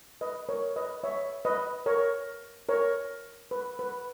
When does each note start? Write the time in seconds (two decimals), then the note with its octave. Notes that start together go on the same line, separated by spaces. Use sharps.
0.21 B4 D#5
0.49 A#4 C#5
0.76 B4 D#5
1.03 C#5 E5
1.45 B4 D#5
1.86 A#4 C#5
2.69 A#4 C#5
3.51 B4
3.79 B4